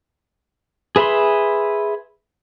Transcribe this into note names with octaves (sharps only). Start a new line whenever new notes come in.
G#4 B4 E5 B5 C6